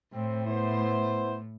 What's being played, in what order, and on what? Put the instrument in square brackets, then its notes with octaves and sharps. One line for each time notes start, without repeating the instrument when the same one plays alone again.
[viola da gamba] A2 [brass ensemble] C4
[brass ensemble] B3 E4 C5